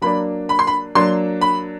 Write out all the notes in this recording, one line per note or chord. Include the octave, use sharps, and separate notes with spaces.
F#3 A#3 D4 B5
B5
C6
B5
F#3 A#3 D4 C6
B5